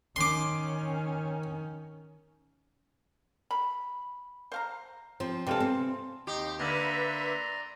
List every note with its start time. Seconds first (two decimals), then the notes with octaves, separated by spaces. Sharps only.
0.16 D#3 C#4 C6 D6
3.51 B5
4.52 C5 F5 A#5
5.20 F3 C4
5.47 C3 E3 G3 F4 A4
5.60 C4
6.27 D#2 D#4 G4 C6
6.59 D3 A#3 B4 D5 E5 A#5 C6